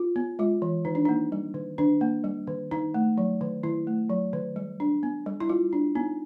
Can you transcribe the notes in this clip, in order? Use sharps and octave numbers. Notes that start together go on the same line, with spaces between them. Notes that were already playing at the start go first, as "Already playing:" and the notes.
Already playing: F4
B3
G#3 F4
E3
D#3 D#4
D4
A#3 D#4
G3
D#3
D#3 D4
A#3
G3
D#3
D#3 D#4
A3
F#3
D#3
D#3 E4
A3
F#3
D#3
G3
D4
B3
G3
E4
G3 F4
D4
B3 D#4